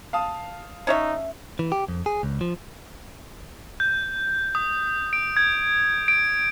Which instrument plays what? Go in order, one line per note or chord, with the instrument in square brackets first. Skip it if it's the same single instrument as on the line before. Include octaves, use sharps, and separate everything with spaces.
[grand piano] F5 A5 D#6
[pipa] C#4 C#5 E5 [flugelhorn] D#4
[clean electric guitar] E3
G4
F2
G#4
C#2
F3
[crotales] G6
D#6
D7
G#6
D7